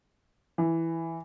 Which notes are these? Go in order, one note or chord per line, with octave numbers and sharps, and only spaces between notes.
E3